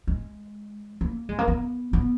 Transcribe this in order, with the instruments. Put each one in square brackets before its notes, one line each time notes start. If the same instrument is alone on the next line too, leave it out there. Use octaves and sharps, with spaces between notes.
[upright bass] G#3
A#3
G#3
A#3
B3
B3